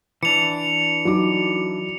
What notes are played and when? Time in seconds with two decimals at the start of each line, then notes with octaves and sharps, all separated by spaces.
0.23 E3 D4 C#7 F7
1.05 F#3 D#4 D6